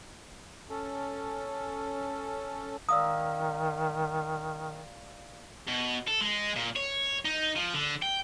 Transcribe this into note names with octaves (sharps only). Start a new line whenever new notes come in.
C#4 A4
D#3 D5 F5 A#5 D#6 E6
B2
A4
G#3
A#2
C#5
D#4
F3
D3
G5